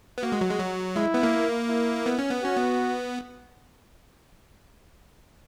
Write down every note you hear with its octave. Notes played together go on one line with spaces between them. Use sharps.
B3
A#3 F#4
G#3
F#3
G#3
F#3
G#3 E4
B3
A#3
E4
B3
C#4
B3
C#4 F#4
B3